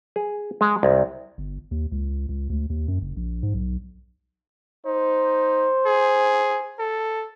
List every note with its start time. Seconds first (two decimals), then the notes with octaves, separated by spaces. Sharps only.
0.16 G#4
0.61 G#3
0.83 C2
1.38 G1
1.71 D#2
1.92 C#2
2.29 C#2
2.50 D2
2.70 D#2
2.88 F#2
3.01 F#1
3.17 A#1
3.43 G#2
3.54 B1
4.86 D#4 C5
5.86 G#4
6.79 A4